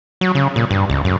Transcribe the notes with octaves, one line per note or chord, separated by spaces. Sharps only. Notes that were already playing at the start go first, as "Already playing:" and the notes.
F#3
C#3
A#2
G2
C#2
F#2